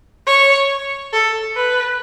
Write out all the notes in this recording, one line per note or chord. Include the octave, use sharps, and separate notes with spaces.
C#5
A4
B4